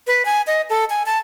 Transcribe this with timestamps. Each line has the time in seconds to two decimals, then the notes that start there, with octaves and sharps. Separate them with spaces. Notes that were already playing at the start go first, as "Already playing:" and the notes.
0.07 B4
0.25 G#5
0.47 D#5
0.70 A4
0.90 G#5
1.06 A5